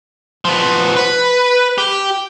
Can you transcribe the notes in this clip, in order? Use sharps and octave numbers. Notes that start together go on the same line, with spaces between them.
F3 B3
B4
G4